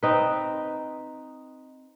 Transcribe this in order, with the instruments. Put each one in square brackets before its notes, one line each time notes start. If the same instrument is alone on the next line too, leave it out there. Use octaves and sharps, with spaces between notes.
[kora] C4 D#4 B4